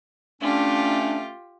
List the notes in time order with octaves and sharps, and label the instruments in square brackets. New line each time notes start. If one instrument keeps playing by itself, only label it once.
[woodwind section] A3 C#4 [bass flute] D4 [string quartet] F4 G4